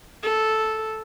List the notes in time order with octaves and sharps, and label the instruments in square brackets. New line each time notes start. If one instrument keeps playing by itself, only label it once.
[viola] A4